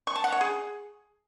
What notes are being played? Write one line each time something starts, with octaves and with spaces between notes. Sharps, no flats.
C#6
A5
F#5
C#5
G#4